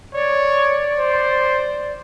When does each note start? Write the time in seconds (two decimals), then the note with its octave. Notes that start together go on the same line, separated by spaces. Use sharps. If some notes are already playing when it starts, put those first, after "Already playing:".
0.14 C#5 D5
0.98 C5